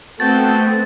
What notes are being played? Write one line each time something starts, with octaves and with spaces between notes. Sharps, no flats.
A3 B3 C4 F#4 G5 A5 A6